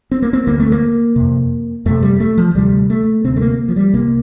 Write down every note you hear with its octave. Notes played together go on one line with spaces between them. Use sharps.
C4
A#3
C4
D2 D3 A#3
A3
A#3
F2 C3
F2 C3 A3
G3
A3
F3
D2 C3 G3
A3
D2 C3 C4
A3
A#3
F3
G3
C2 C3 A#3